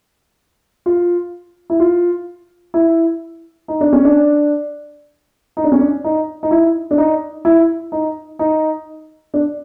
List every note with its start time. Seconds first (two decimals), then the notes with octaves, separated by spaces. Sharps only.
0.86 F4
1.70 E4
1.80 F4
2.74 E4
3.68 D#4
3.81 D4
3.93 C#4
4.05 D4
5.57 D#4
5.64 D4
5.72 C#4
5.79 D4
6.04 D#4
6.43 D#4
6.51 E4
6.91 D4
6.98 D#4
7.45 E4
7.92 D#4
8.39 D#4
9.34 D4